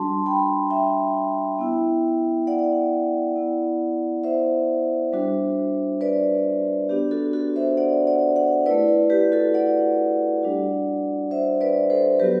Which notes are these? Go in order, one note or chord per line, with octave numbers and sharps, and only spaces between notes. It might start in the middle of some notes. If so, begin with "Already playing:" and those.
Already playing: G3 D4 F#4 A5 C6
G5 B5
E5 G5
B3 E4
D5 F#5
B3 E4
C5 E5
G3 D4 F#4
B4 D5
B3 D4 F#4 G4
F#4 A4
F#4 A4
C5 E5
D5 F#5
D5 F#5
D5 F#5
A3 E4 B4 D5
B4 D5
G4 B4
F#4 A4
D5 F#5
G3 D4 F#4
C5 E5
B4 D5
A4 C5
F#3 B3 F#4 G4 B4